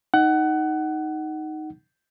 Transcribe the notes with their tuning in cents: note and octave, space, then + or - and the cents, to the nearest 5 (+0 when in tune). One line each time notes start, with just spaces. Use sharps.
D#4 +0 F#5 +20